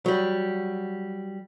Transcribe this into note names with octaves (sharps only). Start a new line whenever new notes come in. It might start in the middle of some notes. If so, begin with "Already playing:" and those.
F#3 G3